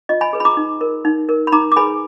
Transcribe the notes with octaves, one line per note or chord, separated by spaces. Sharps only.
F4 D#5
G#5 B5
G#4 B4
B5
A#5 D6
D#4
A#4
D#4
A#4
B5
D#4 A#5 D6
D6
G#4 B4 G#5 B5